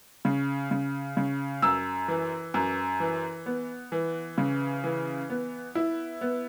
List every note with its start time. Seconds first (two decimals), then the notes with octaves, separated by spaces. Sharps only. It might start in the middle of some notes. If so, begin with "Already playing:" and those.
0.25 C#3
0.71 C#3
1.17 C#3
1.62 F#2 E6
2.08 E3
2.54 F#2
3.00 E3
3.46 B3
3.92 E3
4.38 C#3
4.84 E3
5.30 B3
5.75 E4
6.21 B3